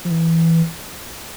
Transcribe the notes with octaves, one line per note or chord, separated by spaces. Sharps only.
F3
E3